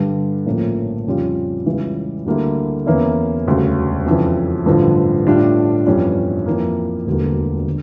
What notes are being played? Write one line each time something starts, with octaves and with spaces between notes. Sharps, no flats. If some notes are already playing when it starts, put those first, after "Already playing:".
Already playing: G2 D3 G3
A#1 A2 F3 A#3 C#4
F2 C#3 G3 C#4 F4
C#2 C#3 E3 G3
D2 D3 G3 A#3 E4
E2 E3 A#3 C#4 E4
E1 D2 C#3 G3
F2 C#3 E3
A1 G2 D3 F3
A2 G3 D4 F4
G1 F2 E3 G3 C#4
F2 E3 A#3
E1 D2 D3 G3 A#3
D3